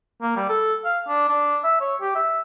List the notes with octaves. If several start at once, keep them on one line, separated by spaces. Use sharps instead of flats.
A#3
G3
A4
F5
D4
D4
E5
C#5
G4
E5